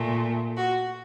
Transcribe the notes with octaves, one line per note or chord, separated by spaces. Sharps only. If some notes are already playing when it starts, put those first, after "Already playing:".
Already playing: A#2 A3
F#4